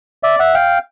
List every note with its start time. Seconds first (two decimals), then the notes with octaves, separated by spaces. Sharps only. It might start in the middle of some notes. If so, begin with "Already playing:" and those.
0.23 D5 E5
0.39 E5 F#5
0.54 F5 G5